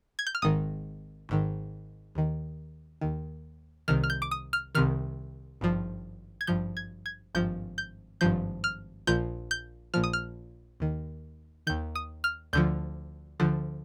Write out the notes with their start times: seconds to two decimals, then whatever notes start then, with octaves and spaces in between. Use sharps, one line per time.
0.19 G#6
0.27 G6
0.35 F6
0.42 G#1 G#2 D#3 D#6
1.29 G#1 G#2 D#3
2.15 D#2 D#3
3.01 D#2 D#3
3.88 C2 C3 D#3 F6
4.04 F6
4.10 G6
4.22 D6
4.31 D#6
4.53 F6
4.75 C2 C3 D#3 F6
5.61 G#1 G2 F3
6.41 G#6
6.47 G#1 G2 F3 G6
6.77 G#6
7.06 G#6
7.35 G#1 G2 F3 G6
7.78 G6
8.21 G#1 G2 F3 G6
8.64 F6
9.07 A#1 A#2 F3 G6
9.51 G6
9.94 A#1 A#2 F3 F6
10.04 D#6
10.13 F6
10.80 D#2 D#3
11.67 D#2 D#3 G6
11.95 D#6
12.24 F6
12.53 D2 D3 F3 G6
13.40 D2 D3 F3